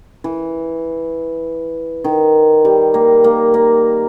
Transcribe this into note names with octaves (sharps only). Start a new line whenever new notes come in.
E3
D#3
G3
A#3
A#3
A#3